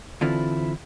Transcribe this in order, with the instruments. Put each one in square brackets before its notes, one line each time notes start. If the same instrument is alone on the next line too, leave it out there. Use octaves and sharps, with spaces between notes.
[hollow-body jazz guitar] D3 E3 C4 E4 F4 A4